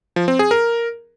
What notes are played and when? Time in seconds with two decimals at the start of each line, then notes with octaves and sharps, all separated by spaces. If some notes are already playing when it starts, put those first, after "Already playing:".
0.16 F3
0.28 C4
0.39 G#4
0.51 A#4